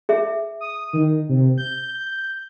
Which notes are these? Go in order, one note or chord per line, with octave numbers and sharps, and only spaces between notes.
G#4 E5
D#6
D#3
C3
G6